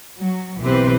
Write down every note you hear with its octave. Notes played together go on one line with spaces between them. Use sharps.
F#3
B1 E3 C4 G4 B4 C5